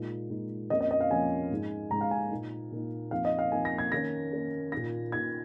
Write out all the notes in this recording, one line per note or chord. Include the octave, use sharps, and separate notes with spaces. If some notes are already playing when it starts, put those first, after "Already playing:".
Already playing: A#2 G#3 D#4
A#2 G#3 D#4
F2 F3 A#3 C#4 D#5
D#5
D#5
F5
F2 F3 A#3 C#4 G#5
G#2 G#3 D#4
G#2 G#3 D#4 A#5
F5
G#5
A#2 A#3 D#4
A#2 A#3 D#4
F2 F3 A#3 D#4 F5
D#5
F5
F2 F3 A#3 D#4 G#5
A#6
G#6
D#3 A#3 C#4 A#6
D#3 A#3 C#4
A#2 A#3 D#4 A#6
A#2 A#3 D#4 G#6